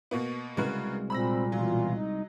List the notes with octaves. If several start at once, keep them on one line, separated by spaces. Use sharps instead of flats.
B2 A#3 B3
C2 C#3 G#3 F#4 A#4 B4
A#2 C4 B5 E6 A#6
B2 E3 F#3 F4
D#4